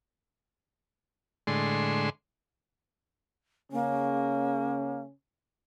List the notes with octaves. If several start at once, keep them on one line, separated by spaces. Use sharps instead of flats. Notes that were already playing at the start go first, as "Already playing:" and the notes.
A2 D3 G#3 C6
C#3 A#3 C#4